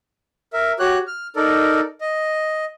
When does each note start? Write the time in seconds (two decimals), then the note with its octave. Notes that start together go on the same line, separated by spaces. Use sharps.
0.53 A#4 E5
0.79 F#4 G4 C#5 F#6
1.07 F6
1.36 D#4 A4 A#4 D5
2.01 D#5